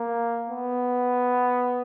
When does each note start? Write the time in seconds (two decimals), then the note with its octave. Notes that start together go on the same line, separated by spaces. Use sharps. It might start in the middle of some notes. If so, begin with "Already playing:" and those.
Already playing: A#3
0.49 B3